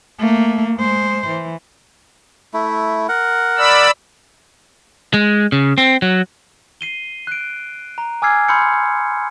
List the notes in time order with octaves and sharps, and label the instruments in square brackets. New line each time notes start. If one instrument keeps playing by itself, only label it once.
[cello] A3 A#3
G#3 C5
E3
[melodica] A3 E4
A#4 F#5
[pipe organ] D5 B5 E6
[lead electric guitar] G#3
C#3
C4
F#3
[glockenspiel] C7 D#7 G7
F#6 D7
A#5
G#5 D6 E6 F6 G#6 C7
B5 C6 E6 F6 G6 C#7